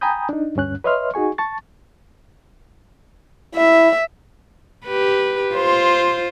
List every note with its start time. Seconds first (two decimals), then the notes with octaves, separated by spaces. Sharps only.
0.01 G5 G#5 A#5 B5 D#6 G6
0.29 D4 D#4
0.55 D2 G2 C#4 F#6
0.84 B4 C#5 D#5 E5 C6 F6
1.14 D#4 F#4 G#4 G#5 C#6
1.38 A5 C#6 A6
3.55 E4 E5
4.86 G4 B4
5.54 F4 C5